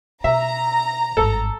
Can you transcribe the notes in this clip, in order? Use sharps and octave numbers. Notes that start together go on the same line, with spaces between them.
B2 E5 A#5
G#1 G2 A4